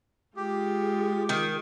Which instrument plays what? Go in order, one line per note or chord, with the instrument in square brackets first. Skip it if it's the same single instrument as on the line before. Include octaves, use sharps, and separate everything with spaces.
[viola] G#3 F4 [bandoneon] G4
[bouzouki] D#3